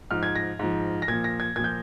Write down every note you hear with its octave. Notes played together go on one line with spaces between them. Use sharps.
G#2 F3 F6
G#6
A#6
G#2 F3
A#6
A#2 F3 G#6
A#6
G#6
A#2 F3 G6 G#6